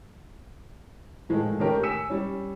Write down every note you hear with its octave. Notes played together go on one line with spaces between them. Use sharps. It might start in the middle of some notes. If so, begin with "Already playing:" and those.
A2 D#3 F3 G#3 A3
D#3 A3 C#4 G4 A#4
G#5 E6 B6 C#7 E7
G3 C#4